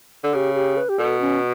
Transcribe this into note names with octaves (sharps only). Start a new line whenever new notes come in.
D3
C#3 G4
G4
B4
G4
B2 A4
C#4